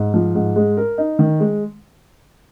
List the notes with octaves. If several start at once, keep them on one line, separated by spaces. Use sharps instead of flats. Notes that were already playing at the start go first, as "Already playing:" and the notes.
Already playing: G#2
F3
G#2
G#3
A#4
D#4
D#3
G#3